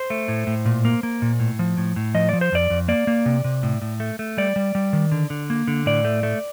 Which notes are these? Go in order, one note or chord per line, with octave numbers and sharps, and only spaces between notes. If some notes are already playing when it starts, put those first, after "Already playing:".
Already playing: C5
A3
A2
A2
A#2
A#3
A#3
A#2
A2
F3
A2
A2
F3 D#5
F3 D5
C5
F2 D5
F2
A#3 D5
A#3
C3
C3
A2
A2
A3
A3
G3 D5
G3
G3
D#3
D3
D3
A#3
D3
A2 D5
A3
A3